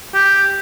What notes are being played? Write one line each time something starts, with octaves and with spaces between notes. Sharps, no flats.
G4